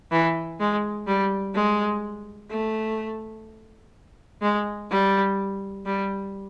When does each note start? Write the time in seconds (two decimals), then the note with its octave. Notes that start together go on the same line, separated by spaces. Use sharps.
0.12 E3
0.60 G#3
1.07 G3
1.55 G#3
2.50 A3
4.42 G#3
4.91 G3
5.86 G3